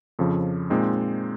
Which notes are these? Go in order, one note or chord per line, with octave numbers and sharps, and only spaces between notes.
F2 C#3 F3
A#2 G#3 C4 D#4